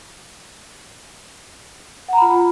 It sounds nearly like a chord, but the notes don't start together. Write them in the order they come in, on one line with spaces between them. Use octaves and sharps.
F#5 A#5 B5 F4